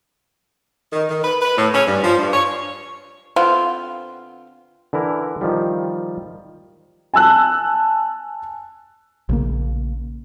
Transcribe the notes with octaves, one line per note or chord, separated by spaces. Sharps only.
D#3
D#3
B4
B4
A2
C#4
G2
F3
G2
C#5
D3 B3 C4 F4
D3 E3 E4 A#4
D#3 F3 G3
G#5 A5 E6 F#6
A#1 C#3 A#3